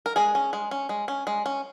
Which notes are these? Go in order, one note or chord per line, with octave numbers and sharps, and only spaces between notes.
A#4
G#3 G#4
C#4
G#3
C#4
G#3
C#4
G#3
C#4